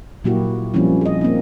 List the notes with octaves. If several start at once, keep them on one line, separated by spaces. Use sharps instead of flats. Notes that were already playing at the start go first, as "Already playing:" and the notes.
A#2 F#3 A#3 E4 F#4 G4
F3 G3 A#3 C4 C#4 E4
G#4 D#5
A#3 C4 D#4